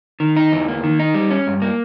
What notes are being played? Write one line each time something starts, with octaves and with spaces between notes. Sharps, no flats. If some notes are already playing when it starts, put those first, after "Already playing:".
D#3
D#4
E2
A#3
D#3
D#4
G3
C#4
G2
A#3